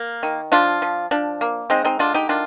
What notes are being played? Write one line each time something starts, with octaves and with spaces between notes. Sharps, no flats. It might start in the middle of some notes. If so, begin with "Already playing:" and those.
Already playing: A#3
D#3
F3 D4 F4
F3
F3 D4
A#3
G#3 C4 D#4
C4 D#4
D3 D4 F4
D#4 G4
D#3 D4 F4